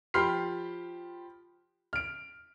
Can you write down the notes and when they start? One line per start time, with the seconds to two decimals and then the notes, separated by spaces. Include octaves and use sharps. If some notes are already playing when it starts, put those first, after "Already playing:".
0.14 F3 G4 B5 C6 F6 C7
1.93 F6 D7